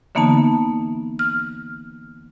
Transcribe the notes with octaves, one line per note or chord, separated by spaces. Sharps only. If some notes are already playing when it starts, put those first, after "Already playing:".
D3 E3 A#3 B3 D#4 A5
F6